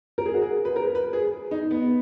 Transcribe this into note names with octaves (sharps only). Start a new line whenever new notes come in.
A#4
G#4
F#4
G#4
B4
A#4
B4
G#4
D#4
B3